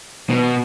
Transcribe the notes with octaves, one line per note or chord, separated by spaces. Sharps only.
B2